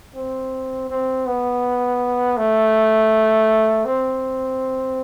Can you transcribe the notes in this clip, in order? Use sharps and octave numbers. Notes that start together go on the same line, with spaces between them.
C4
C4
B3
A3
C4